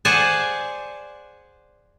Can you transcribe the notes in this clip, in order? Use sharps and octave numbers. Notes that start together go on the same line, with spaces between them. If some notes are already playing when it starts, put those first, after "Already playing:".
G#4 C5 D5 F#5 G#5 A5